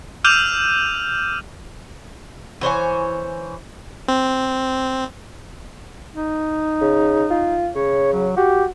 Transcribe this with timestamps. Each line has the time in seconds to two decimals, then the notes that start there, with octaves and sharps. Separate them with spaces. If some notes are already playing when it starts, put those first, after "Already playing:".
0.24 D6 E6 F6 G6 D#7 F7
2.61 E3 C5 C#5 G#5
4.08 C4
6.14 D#4
6.81 C#3
7.30 F4
7.75 C#3 C#5
8.13 F#3
8.37 F#4 G4